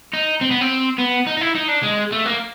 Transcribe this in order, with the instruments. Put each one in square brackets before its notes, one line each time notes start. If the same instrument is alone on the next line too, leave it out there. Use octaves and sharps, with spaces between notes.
[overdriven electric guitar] D#4
C4
B3
C4
B3
D#4
D#4
E4
D#4
D4
G#3
A3
A#3